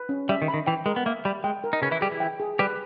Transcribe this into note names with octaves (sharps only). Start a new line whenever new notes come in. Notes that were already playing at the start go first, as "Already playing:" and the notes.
Already playing: B4
C#4
G3 E5
D#3
B5
D#3
E3 G5
G#3 A#4
B3
A#3 E5
G3 B5
G#3 G5
A#4
D#4
C#3 C#4 B4
E3 E4
G3 G4 G#4
E3 E4
G5
G#4
G3 G4 B4